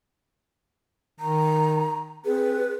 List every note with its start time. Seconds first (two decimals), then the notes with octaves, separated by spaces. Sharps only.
1.20 D#3 A#5
2.25 C4 G#4 B4